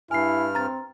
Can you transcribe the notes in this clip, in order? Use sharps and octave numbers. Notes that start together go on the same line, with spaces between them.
G2 E4 G#5 F6 C7
C4 A#5 A6